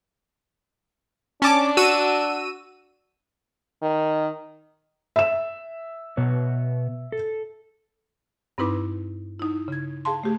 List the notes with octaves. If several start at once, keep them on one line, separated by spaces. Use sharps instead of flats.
C#4 D4 A5 D6
F#4 E6 D#7
D#3
E5 E7
B2 B3 C#5
A4
G2 C4 D#4 E4 B4 D6
D#4 E4
C#3 G#6
G#4 F5 A5 C6
A3 G4 G#4